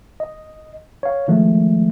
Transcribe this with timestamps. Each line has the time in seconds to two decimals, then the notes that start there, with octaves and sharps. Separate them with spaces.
0.20 D#5
1.03 C#5 F5
1.28 D#3 F3 G#3 A3